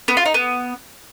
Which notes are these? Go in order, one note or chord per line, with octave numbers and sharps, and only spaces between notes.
B3
F4
D#4
B3